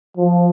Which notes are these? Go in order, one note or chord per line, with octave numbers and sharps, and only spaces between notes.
F3